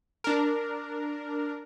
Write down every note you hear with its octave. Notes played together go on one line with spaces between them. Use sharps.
D4 A#4